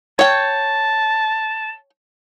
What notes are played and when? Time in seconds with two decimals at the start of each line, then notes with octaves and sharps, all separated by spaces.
0.19 C#5 G5 A5